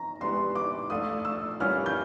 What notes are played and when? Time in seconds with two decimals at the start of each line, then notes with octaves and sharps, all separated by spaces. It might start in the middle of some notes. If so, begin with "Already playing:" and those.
Already playing: A#5
0.21 E3 G#3 B3 D4 G4 C6
0.55 D6
0.90 F3 A3 D4 F4 D#6
1.25 E6
1.60 E3 G3 A#3 C#4 F4 F6
1.86 G6